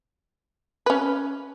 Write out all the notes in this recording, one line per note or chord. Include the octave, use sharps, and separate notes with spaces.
C#4 B4